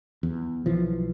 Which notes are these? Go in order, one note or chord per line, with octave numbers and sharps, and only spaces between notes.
E2
B1 E3 F3